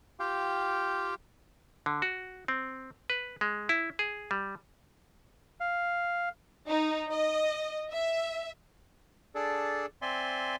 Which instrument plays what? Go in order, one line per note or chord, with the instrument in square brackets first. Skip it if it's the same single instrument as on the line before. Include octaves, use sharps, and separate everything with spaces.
[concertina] F4 G4 F5 G5
[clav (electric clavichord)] D3
F#4
C4
B4
G#3
E4
G#4
G3
[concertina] F5
[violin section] D#4
D#5
E5
[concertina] D4 G#4 A4 D5
C4 D5 E5 G#5 C6